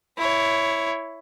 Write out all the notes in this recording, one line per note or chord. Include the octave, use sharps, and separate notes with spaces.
E4 C#5